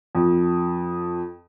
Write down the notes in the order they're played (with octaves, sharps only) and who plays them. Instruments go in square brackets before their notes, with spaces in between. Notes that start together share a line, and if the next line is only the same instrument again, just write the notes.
[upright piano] F2